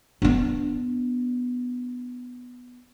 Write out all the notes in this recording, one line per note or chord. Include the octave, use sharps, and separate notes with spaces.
B3 D4